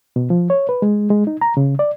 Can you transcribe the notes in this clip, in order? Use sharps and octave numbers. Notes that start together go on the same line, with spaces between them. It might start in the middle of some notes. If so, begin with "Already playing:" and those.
B2
F3
C#5
B4
G#3
G#3
D#4
A#5
C#3
D5